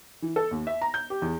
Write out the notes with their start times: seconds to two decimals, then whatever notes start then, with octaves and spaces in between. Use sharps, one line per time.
0.22 E3
0.36 A4
0.51 D#2
0.67 E5
0.82 A#5
0.94 G6
1.10 G4
1.22 E2